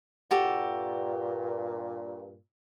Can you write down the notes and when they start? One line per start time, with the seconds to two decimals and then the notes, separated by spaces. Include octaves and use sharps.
0.31 G2 A#2 F#4 G4 A4